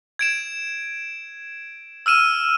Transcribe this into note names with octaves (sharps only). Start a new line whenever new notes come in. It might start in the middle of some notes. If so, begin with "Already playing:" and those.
G#6 D7 E7
E6 F6 D#7 E7